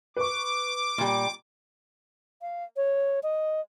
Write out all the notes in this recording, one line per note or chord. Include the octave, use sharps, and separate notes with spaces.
B4 C#6 D6
A#2 G3
F5
C#5
D#5